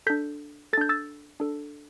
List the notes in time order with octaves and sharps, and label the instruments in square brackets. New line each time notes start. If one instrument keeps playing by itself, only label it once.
[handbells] D4 A4 G6 B6
A4 A6
D4 G6
E6 A6
D4 A4